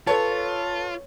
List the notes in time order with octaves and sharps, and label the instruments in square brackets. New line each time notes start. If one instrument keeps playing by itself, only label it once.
[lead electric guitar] F4 [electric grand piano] A4 B4 A5 [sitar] C#5